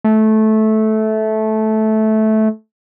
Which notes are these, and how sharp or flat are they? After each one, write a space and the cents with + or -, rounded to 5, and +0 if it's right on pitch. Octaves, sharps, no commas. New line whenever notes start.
A3 -15